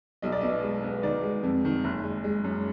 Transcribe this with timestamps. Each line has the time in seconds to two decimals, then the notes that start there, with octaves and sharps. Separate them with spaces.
0.22 B1 D#5
0.32 D5
0.41 B2 D#5
0.63 G#3
0.84 B3
1.03 D#3 D5
1.23 G#3
1.43 F2
1.65 D#3
1.84 F#1
2.04 G#3
2.24 G#3
2.44 F#2